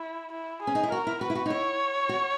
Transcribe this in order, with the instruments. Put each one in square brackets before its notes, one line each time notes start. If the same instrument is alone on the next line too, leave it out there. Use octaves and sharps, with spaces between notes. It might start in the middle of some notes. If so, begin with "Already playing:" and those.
Already playing: [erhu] E4
E4
G#4
[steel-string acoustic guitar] C#4
D#4
E4
[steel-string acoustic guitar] F#4 [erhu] A#4
[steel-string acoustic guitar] E4
[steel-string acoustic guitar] F#4 [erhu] B4
[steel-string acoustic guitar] E4
F#4
D#4
[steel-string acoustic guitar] E4 [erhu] C#5
[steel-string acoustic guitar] F#4